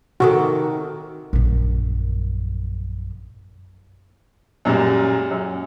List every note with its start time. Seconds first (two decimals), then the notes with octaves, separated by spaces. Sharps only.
0.20 C3 D#3 F#4 A4
1.33 A#1 F#2
4.65 F#2 A#2 G3 G#3
5.31 F#2